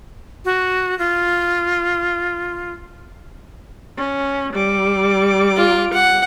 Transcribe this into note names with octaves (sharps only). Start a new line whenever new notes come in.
F#4
F4
C#4
G3 D6
F4
F#5